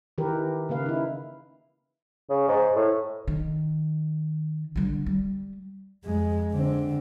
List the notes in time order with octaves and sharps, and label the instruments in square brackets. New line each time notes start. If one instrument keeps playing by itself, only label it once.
[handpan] D#3 E3 G4 A#4 B4
C#3 A#3 B4 F5
D#4 E4
[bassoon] C#3
G#2
A2
[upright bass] D#3
D3 G3
G3
[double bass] F2 G#3
D3 C4